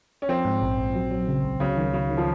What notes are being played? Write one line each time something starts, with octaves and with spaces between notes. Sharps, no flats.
C#4
F3 C4
G#2
A#1
A#1
F#3
F#3
C#3
C#2
C#3 F#3
D#3
C#3 F#3
D#3
F3